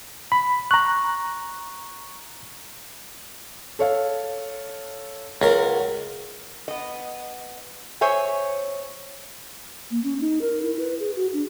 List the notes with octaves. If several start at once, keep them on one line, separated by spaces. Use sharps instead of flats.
B5
A#5 C#6 F#6
A4 C#5 F5
C#2 F#3 A#4
B3 D#5
C5 C#5 E5 G#5
A#3
C#4
D#4
A#4
E4
B4
G#4
F#4
D4